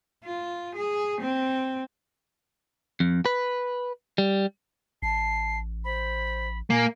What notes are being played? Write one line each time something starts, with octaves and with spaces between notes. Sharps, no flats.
F4
G#4
C4
F2
B4
G3
A1 A5 C7
C5 B5
A#2 A#3 G#5